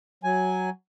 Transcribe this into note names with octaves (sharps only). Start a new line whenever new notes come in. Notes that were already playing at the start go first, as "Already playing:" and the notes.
F#3 G#5